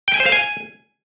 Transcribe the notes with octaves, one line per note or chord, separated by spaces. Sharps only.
G5
G#5
C5
F5
G#5